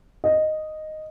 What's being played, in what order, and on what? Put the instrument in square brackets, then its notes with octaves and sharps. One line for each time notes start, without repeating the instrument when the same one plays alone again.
[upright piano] D#5